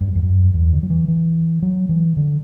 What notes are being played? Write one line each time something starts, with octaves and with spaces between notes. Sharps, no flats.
G2
F#2
E2
F#2
E2
D3
F#3
E3
E3
F#3
E3
D3